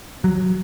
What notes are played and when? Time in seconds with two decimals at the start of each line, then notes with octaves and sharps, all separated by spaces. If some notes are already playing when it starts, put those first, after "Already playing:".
0.24 F#3